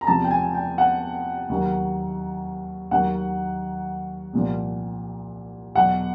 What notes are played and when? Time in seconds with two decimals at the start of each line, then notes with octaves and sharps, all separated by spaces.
0.01 A#5
0.07 E2 C3 F3 A5
0.24 G5
0.31 G#5
0.55 G5
0.78 F#5
1.49 D#2 D#3 F#3
2.91 D#2 D#3 F#3 F#5
4.33 C2 A#2 F3
5.75 E2 B2 F#3 F#5